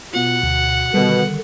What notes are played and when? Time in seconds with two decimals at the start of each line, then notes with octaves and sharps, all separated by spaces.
0.13 B2 B3 F4 F#5
0.43 D2
0.94 B2 D3 D#3 G3